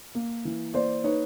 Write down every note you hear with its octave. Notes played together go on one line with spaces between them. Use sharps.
A#3
E3
A#3 C5 D5
D#4 B4 C#5